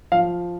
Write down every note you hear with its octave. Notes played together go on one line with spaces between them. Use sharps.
F3 F5